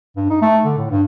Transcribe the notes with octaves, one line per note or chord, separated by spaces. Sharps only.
G2
D#4
A3
D3
A2
G2